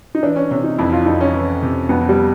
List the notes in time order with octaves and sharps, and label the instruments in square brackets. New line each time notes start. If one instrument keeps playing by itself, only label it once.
[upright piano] D#4
[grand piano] E3 [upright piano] D4
[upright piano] C#4
[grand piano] C3 [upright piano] C#4
[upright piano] D#4
[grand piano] F2 [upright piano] E4
[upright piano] F4
[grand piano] F2 [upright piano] D#4
[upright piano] C#4
[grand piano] E3
C3
[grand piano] F2 [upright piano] B3
[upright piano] G3